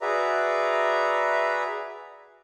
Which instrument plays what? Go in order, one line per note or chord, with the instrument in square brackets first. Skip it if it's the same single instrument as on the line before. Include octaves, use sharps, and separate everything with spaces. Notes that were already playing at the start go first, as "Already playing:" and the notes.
[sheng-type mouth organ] F#4 G#4 B4 D5 E5 A#5